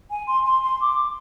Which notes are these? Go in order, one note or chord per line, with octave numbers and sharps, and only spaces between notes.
G#5
C6
C6
C6
D6